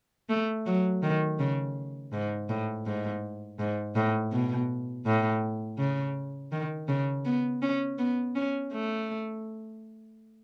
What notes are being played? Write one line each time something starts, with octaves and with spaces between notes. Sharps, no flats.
A3
F#3
D#3
C#3
G#2
A2
G#2
G#2
A2
B2
A2
C#3
D#3
C#3
B3
C#4
B3
C#4
A3